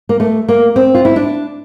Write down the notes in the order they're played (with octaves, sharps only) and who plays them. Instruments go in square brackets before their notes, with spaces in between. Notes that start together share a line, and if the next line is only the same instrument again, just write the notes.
[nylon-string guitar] A#3
A3
A#3
C4
F4
E4
D4